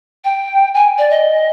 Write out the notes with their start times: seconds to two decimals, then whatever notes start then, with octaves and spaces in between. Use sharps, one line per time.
0.24 G5
0.74 G#5
0.98 D5
1.10 D#5